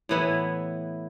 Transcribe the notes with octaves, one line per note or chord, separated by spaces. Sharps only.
A2 E3 B3 E4